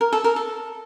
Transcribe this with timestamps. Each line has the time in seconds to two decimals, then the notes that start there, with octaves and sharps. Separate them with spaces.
0.01 A#4
0.13 A4
0.24 A#4
0.36 A4